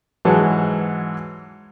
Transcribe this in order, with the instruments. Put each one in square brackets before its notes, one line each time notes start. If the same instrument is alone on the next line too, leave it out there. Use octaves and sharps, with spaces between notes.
[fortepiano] G#2 E3 F#3 F#4 A5